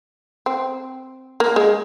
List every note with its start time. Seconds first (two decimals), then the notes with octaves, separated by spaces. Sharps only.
0.46 C4
1.40 A#3
1.56 G#3